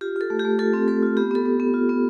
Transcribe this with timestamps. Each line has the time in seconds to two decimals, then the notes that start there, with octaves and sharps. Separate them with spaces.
0.01 F4 G4
0.16 F4 A4
0.30 A3
0.39 G4
0.45 A3
0.59 F4 A4
0.74 C4
0.88 A3 A4
1.03 F4
1.17 B3 G4
1.31 B3 A4
1.46 B3
1.60 B3
1.74 F4
1.89 B3